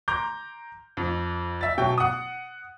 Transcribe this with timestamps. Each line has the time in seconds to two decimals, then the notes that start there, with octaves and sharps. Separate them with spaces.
0.08 A#5 C6 D6 G6
0.97 F2
1.61 E5 A6
1.78 B2 F#3 G5
1.98 F#5 D#6